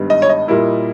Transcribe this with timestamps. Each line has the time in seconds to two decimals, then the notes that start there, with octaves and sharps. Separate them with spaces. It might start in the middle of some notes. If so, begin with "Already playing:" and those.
Already playing: G#1 G2 G3 B3
0.10 D#5
0.22 C#5
0.29 D#5
0.48 A#2 G3 A#3 E4